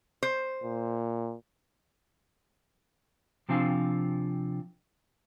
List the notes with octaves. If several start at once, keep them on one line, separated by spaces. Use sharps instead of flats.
C5
A#2
C3 F3 C4 D4 F5 G#5